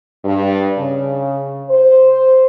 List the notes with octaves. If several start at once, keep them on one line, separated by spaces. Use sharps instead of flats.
G2
C#3
C5